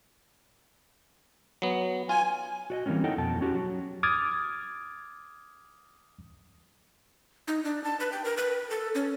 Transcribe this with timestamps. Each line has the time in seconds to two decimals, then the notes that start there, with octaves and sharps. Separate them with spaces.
1.62 F#3 B3
2.09 F4 G#5
2.70 F#4 D5 D#5
2.86 E3 G3 A#3 C4 C#4
3.04 D#4 E4 A4 D#5 F#5 G5
3.18 F2 B2 G5 A5
3.41 C#4 F#4 G4
3.55 F#3
4.03 D6 D#6 F6 G#6 A6
7.48 D#4
7.65 D4
7.84 A5
8.00 B4
8.12 G5
8.24 A#4
8.37 B4
8.70 A4
8.95 C#4